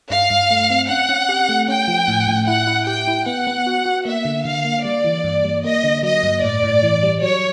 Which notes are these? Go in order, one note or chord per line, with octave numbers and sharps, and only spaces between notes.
G2 F5
G2
A3
C4
C#4 F#5
C#4
G4
A3
C#4 G5
F3
A2
A2
E4 F#5
E4
G4 G5
E4
B3 F#5
B3
F#4
F#4
A#3 E5
D3
D3 F5
A#3
G3 D5
E3
G2
G3
A#3 D#5
D3
F#3 D#5
G2
A2 D5
A2
E3
G3
F#3 C#5